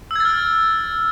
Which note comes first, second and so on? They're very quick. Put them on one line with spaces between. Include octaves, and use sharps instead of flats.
E6 G#6 A6 F6